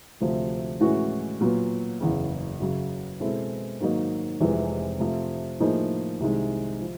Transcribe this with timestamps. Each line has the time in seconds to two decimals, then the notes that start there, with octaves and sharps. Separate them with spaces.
0.20 D2 C3 F3 A3
0.80 A2 E3 G#3 C#4 F#4
1.41 A#2 F#3 B3
2.00 F#1 E2 C#3
2.60 F#2 C#3 F#3
3.20 B2 G#3 C4 E4 A4
3.80 G#2 D#3 F#3 A#3 D#4
4.40 F1 F2 C3 E3 G#3
5.00 C3 F3 A3
5.60 A2 F3 A#3 D#4 G#4
6.20 C2 C3 D#3 G#3
6.81 F3